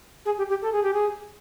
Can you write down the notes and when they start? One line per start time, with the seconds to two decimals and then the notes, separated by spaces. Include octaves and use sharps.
0.25 G#4
0.38 G4
0.49 G4
0.62 A4
0.72 G#4
0.83 G4
0.93 G#4